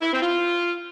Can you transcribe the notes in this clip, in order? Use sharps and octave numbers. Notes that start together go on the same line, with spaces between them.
E4
C4
F4